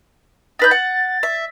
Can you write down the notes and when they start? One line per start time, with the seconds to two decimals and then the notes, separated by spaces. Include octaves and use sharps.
0.59 D#4 B4 G6 A6
0.71 F#5
1.23 E5